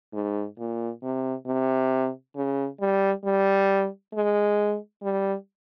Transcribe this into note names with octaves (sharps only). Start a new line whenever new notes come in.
G#2
A#2
C3
C3
C#3
G3
G3
G#3
G3